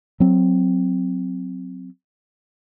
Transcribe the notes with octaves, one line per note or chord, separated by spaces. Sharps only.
F#3 C4